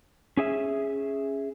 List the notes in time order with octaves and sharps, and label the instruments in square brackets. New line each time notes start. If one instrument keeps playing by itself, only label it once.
[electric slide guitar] C#4 G#4 E5